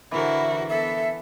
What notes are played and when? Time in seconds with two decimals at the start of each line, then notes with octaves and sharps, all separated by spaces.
0.11 D3 E3 E4 F#4 A#4 C5
0.70 B3 A4 E5